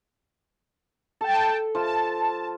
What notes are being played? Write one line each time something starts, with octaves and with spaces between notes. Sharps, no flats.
A4 G5 A5
F3 F4 A5